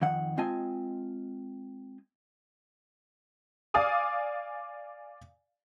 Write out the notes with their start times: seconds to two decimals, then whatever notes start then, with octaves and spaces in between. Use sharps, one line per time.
0.02 F2 D#3 F#5
0.37 G#3 C4 F4 D#5 G#5 A5
3.74 D5 F5 G#5 D6 D#6